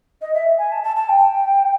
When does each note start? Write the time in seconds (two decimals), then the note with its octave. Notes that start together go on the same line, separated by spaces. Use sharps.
0.22 D#5
0.34 E5
0.58 G#5
0.72 A5
0.84 A5
0.96 A5
1.09 G5